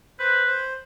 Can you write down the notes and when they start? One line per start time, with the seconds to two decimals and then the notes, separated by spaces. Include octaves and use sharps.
0.19 B4 C5
0.46 C5